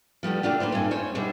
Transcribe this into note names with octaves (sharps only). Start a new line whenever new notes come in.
F3 G3 A3 B3
A3 A#3 D4 F4 G4
A#3 D4 B4 C5
G2 C3 D#4 G#5
C5 C#5 G#5
B2 G3 D4 E5